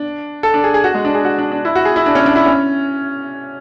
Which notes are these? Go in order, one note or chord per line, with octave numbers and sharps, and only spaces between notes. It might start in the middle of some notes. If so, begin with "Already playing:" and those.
Already playing: D4
A4
D4
G#4
G#4
F#4
G#3
D4
G#4
F#4
D4
D4
E4
F#4
G#4
E4
D4
C#4
D4
E4
C#4